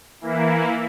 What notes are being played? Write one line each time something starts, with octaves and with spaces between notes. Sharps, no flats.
E3 A#3 E4